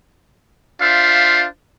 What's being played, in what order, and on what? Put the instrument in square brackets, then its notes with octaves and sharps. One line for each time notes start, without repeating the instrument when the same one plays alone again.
[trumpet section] D4 F4 C5 E5 F5